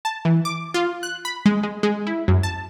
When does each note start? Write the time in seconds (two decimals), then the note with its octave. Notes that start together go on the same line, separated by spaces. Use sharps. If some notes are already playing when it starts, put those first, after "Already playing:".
0.05 A5
0.25 E3
0.45 D6
0.74 F4
1.03 F#6
1.25 B5
1.46 G#3
1.63 G#3
1.83 G#3
2.07 E4
2.28 F#2
2.43 A5